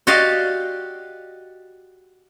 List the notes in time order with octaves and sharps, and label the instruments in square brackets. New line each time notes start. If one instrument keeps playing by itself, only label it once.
[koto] F#4 G4 D5 D#5 F5